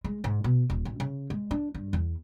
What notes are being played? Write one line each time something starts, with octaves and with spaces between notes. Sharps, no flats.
G#3
G#2
B2
D#1
A1
C#3
G#3
D4
G2
E2